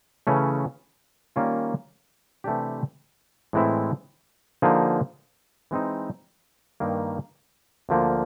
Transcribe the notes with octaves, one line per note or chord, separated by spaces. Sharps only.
C#3 E3 A3 C#4
D#3 G3 A#3 C#4 F4
C3 E3 A3 D4 G4
A2 E3 G#3 C4 E4
D3 F3 A#3 D#4 G#4
E3 G#3 C4 D#4
G2 D#3 G3 A#3
D2 D3 F3 A#3